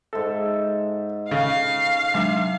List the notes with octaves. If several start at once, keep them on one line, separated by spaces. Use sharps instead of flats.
G#2 A4 E5
C#3 A4 F5
C3 F#3 G#3 D4